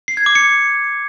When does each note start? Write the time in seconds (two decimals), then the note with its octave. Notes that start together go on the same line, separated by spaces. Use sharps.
0.08 C7
0.17 G#6
0.26 D6
0.35 C#7